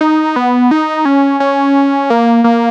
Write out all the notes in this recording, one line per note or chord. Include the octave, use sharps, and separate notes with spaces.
D#4
B3
D#4
C#4
C#4
A#3
A#3